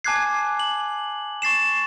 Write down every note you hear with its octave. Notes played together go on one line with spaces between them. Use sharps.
G#5 A5 D6 F#6 G#6 C7
F#7
C#6 A6 C7 E7